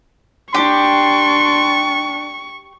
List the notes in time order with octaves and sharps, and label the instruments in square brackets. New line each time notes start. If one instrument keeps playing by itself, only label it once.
[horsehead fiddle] D4 [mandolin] G4 [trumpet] C6 [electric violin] C#6